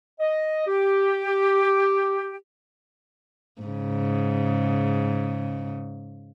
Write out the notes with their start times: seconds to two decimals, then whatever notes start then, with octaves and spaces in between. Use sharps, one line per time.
0.20 D#5
0.67 G4
3.62 G#2 C#3